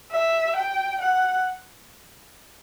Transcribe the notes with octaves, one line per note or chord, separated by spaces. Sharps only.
E5
G5
F#5